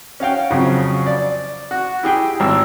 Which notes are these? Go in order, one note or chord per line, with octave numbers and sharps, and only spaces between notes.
C#4 F#4 F5 G5
F2 C#3 F#3
D5
F#4
E4 G4 G#4 G5
G#1 E6